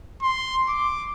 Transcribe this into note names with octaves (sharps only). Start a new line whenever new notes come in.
C6
D6